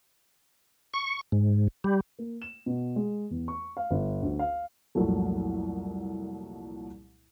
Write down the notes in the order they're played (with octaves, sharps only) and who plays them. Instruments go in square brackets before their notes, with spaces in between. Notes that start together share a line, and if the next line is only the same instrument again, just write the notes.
[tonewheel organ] C#6
G#2
G3
[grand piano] A#3
E7
B2
G#3
E2
C#6
F5
G1
D2
F5
[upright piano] C2 F2 A#2 F#3 A3